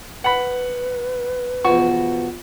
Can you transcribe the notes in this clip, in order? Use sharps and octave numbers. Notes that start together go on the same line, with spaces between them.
B4 F#5 B5
E2 B2 F3 F#4 C#6